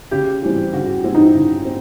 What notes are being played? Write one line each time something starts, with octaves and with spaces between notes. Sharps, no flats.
C#3 G4
E3 G3 C4
C#3 F#4
E3 G3 C4 E4
D#4
E4
C#3
C4